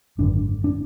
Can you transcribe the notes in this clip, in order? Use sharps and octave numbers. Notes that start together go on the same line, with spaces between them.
G#1 F#2 D3 D4
D4